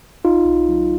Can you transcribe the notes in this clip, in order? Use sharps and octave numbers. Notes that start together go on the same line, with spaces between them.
B1 D#4 F4
B1
F#3